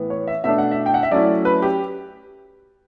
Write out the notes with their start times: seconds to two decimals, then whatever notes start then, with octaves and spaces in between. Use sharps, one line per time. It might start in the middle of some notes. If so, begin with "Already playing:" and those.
Already playing: A2 E3 B3
0.10 C#5
0.28 E5
0.44 B2 A3 D4 E5
0.58 F#5
0.71 E5
0.86 G5
0.94 F#5
1.03 E5
1.11 F#3 A3 C#4 E4 D5
1.45 B4
1.62 G4